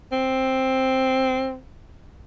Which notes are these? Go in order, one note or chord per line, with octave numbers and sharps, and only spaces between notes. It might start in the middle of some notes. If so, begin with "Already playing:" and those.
C4